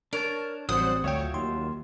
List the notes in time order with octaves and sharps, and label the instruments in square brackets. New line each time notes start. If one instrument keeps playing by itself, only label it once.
[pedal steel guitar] D4 C#5 A5 [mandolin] A#4
[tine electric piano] A1 C4 [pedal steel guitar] F#3 G3 [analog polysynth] C5 F#5 [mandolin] D#6
[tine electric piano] D2 G5 [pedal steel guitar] F#3 F4 E5 [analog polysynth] C#5
[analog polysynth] D#2 [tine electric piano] C6